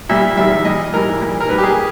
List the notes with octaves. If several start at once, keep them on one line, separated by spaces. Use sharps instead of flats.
A#2 G3 E5
E2 D#3 G3 E5
A#2 G3 D#5
G#2 E3 G3 A#4
A#2 G3
A#4
A#2 G3 B4
G4
G#4